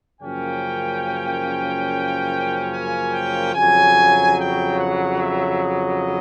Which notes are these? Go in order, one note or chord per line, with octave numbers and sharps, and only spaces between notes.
F#2 C#3 F3 A#3 C#4 G5
G#5
G5
F2 C#3 F#3 G#5
G5
F#5
E5
D#5